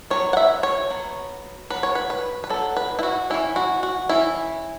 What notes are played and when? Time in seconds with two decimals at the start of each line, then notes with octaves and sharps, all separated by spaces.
0.10 F#3 B3 C#5
0.33 F#5
0.37 E5
0.63 C#5
0.90 F#3 B3
1.70 F#3 B3 B4
1.83 C#5
1.95 B4
2.10 B4
2.44 B4
2.50 F#3 B3 A4
2.77 B4
2.99 E4
3.03 F#4
3.30 E3 C#4 E4
3.56 F#4
3.83 F#4
4.09 E3 C#4 E4